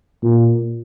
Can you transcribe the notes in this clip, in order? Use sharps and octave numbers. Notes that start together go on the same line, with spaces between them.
A#2